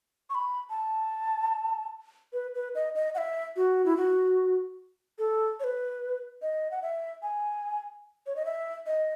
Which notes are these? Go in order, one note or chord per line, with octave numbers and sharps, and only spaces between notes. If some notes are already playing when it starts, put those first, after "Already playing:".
C#6
B5
A5
B4
B4
D#5
D#5
F#5
E5
F#4
E4
F#4
A4
C#5
B4
D#5
F#5
E5
G#5
C#5
D#5
E5
D#5